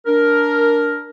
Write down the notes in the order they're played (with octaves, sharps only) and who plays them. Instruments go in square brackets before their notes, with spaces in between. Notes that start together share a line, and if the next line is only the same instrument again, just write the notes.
[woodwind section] D4 A#4